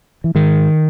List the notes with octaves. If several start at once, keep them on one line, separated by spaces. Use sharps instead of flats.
E3
G#2 D#3